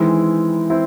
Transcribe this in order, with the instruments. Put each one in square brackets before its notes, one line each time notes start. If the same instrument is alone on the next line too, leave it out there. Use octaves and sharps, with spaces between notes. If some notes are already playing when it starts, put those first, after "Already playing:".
Already playing: [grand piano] D#3 G#3 C4 E4 [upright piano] E3
[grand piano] C4 E4